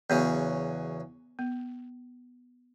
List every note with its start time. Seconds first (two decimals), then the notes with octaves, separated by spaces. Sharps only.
0.10 E2 C#3 F#3 B3
1.39 B3